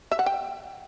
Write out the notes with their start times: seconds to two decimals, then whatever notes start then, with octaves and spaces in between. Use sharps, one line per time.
0.11 E5
0.19 F#5
0.26 G5